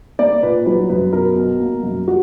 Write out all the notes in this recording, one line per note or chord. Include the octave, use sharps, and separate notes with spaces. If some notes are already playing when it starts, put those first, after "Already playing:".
A#3 D5
A#2 B4
F#3 B4
F#2 B4
B2 A#4
B2
A#3
F#2
G3 F#4